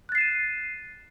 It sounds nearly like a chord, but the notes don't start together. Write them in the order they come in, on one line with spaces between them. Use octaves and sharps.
F#6 A6 C7 E7 D#7